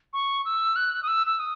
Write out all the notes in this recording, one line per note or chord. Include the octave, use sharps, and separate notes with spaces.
C#6
E6
F#6
D#6
E6
E6
D#6